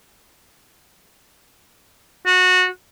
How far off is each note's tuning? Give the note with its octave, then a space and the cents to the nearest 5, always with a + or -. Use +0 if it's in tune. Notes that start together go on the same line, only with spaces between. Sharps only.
F#4 -20